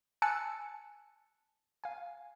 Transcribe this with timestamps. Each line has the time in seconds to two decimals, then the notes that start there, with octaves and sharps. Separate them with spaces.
0.22 G#5 A5 E6 F#6 A6 C#7
1.84 F5 G#5